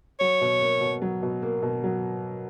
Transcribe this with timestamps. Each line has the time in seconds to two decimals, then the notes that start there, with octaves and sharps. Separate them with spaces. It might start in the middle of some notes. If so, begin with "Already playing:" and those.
0.20 F#3 C#5
0.41 B2
0.61 A#3
0.81 B2
1.02 F#3
1.23 B2
1.42 A#3
1.62 B2
1.84 F#3